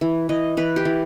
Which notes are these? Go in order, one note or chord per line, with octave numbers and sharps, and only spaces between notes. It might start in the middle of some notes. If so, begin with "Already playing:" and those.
E3
E3 D#5
E3 B4
G4
E3